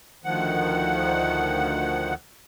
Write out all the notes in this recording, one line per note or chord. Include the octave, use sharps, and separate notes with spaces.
D2 D#3 F3 F#5